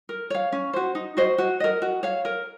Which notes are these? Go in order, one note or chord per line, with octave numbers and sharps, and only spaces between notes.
A#4
C#5 F5
C#4
F#4 C5
D#4
F#4 C5 D#5
F#4
A#4 D#5
F#4
C#5 F5
A#4